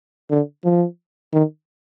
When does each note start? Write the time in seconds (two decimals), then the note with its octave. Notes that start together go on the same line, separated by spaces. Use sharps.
0.31 D3
0.64 F3
1.33 D#3